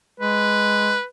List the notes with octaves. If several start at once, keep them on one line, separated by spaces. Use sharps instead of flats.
G#3 B4